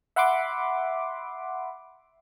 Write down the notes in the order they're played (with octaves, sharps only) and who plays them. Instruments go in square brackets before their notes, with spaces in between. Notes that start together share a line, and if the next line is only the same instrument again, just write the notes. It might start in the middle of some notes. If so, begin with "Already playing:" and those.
[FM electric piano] E5 F#5 B5 C6 D6